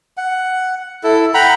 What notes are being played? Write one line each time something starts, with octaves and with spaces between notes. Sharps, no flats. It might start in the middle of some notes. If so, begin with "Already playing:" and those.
F#5
E4 A4
F#5 G5 A#5 B5